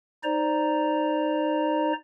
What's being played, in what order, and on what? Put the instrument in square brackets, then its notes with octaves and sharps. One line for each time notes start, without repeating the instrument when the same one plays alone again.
[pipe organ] D#4 C5 D5 A#5